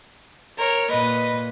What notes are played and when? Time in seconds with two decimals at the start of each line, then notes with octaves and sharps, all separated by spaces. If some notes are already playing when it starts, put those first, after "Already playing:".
0.58 A#4 C#5
0.91 A#2 B4 D#5